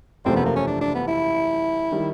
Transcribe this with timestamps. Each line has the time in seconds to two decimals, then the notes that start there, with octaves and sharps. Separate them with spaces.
0.25 F#1 E2 C3 F3 A3 C4
0.36 B3
0.46 A#3
0.56 C#4
0.67 D4
0.81 D4
0.95 B3
1.08 E4
1.92 D#3 G3